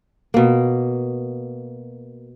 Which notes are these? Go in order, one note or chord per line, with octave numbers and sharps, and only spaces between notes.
B2 A#3